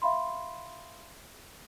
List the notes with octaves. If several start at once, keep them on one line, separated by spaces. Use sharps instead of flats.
E5 F5 B5 C6